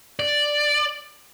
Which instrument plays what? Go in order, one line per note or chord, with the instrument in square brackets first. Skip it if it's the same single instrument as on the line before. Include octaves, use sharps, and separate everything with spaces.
[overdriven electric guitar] D5